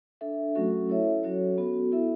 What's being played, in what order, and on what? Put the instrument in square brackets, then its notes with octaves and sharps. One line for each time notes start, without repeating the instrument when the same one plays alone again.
[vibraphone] D4 A4 E5
F#3 A3 C#4 F#4 A4
E4 A4 C#5 E5
F#3 C#4 F#4 A4 C#5
B3 F#4 A4
B3 E4 A4 E5